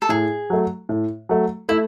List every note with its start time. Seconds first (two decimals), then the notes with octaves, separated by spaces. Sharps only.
0.02 A4
0.09 A2 G#4
0.50 F#3 A3
0.89 A2
1.29 F#3 A3
1.69 A3 E4